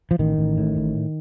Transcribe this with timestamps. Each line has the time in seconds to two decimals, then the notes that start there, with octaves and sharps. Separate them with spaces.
0.11 F3
0.19 A1 D#3
0.38 A1
0.58 A2
0.77 A1